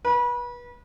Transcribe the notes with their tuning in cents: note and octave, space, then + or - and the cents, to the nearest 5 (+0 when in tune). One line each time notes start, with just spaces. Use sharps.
B4 -30